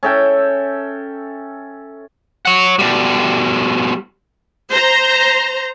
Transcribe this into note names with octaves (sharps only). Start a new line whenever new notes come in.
C#4 A4 E5 G5
C#5 F#5
B2 G3
C5 A#5